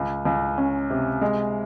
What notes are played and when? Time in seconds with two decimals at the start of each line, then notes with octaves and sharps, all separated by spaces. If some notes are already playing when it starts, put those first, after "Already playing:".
Already playing: C#2
0.25 C#2
0.58 C#4
0.90 C3
1.21 G#3